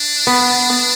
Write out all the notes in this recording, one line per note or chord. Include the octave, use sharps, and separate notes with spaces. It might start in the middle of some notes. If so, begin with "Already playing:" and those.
Already playing: D4
B3